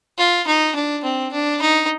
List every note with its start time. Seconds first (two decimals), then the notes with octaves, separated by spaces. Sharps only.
0.18 F4
0.47 D#4
0.75 D4
1.04 C4
1.32 D4
1.61 D#4